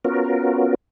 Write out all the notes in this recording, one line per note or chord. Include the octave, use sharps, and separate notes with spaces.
B3 C#4 F4 F#4 A#4